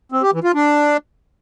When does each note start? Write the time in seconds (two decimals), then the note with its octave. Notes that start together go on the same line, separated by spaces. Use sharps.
0.12 C4
0.23 G4
0.33 E3
0.44 F4
0.54 D4